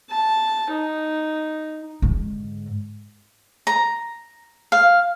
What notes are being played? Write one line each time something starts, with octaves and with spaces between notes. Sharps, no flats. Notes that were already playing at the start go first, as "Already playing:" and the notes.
A5
D#4
G#2 D3
A#5
F5